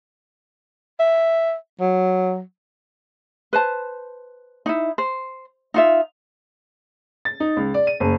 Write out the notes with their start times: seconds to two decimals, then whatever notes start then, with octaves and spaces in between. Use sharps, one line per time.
1.00 E5
1.80 F#3
3.53 B4 C5 A5
4.66 D#4 E4
4.98 C5
5.74 D#4 F4 E5
7.25 A6
7.40 D#4
7.57 C#2
7.74 D5
7.87 D#7
8.00 F#1